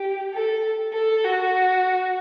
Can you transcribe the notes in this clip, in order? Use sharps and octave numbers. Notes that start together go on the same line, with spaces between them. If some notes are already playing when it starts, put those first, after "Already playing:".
Already playing: G4
A4
A4
F#4